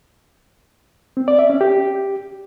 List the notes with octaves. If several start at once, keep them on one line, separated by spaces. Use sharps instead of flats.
C4
D5
E5
C#4
G4